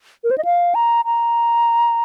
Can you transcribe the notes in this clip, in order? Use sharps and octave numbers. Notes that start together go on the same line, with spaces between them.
A#4
C5
D#5
F5
A#5
A#5